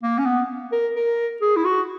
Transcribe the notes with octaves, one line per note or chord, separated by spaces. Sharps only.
A#3
C#4
B3
A#4
A#4
G#4
E4
F#4